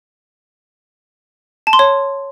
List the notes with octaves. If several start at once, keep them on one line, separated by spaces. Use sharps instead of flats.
A5
C6
C#5